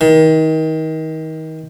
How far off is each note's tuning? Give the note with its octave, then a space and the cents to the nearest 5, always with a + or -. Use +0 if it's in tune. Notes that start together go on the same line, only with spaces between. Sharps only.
D#3 +30